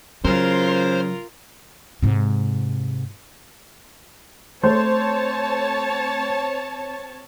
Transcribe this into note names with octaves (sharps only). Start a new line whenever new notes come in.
C#3 F#3 F4 A#4 C5
G#2 C3
A3 C4 C5 C#5 A5